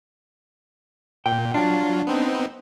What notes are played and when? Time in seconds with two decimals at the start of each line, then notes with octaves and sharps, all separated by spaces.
1.26 A#2 G5
1.54 F#3 D4 F4
2.07 B3 C4 D#4